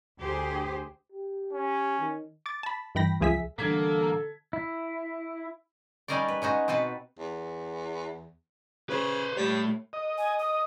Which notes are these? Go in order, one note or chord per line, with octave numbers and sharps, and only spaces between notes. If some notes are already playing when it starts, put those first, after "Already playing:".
D2 G4 G#4 C5
G4
C#4
D#3
D6 A6
A5 B5
G2 E3 G5 B5 A#6
C#2 F3 G#4 E5 B6
A2 D3 E3 G3 A#3 A4 G#6 B6
E4
G3 C#4 D#4 A#4 C5 D5
B4
G#3 C#4 D#4 F#4
B2 C4 F#4 B4 A5
E2
C#3 B4 C5
G3 A3 C#5
D#5
G#5
D#6